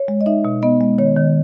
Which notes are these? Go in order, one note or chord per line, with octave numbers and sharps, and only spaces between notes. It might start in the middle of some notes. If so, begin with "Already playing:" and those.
Already playing: C#5
G#3
D#5
D#4 E5
B2
B3 D#5
G#3
D#3 C#5
D#3